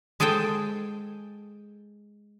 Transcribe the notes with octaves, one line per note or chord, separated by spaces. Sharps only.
G#3 G#4 A4 C5 G5